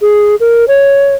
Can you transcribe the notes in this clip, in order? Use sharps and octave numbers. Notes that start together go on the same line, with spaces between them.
G#4
A#4
C#5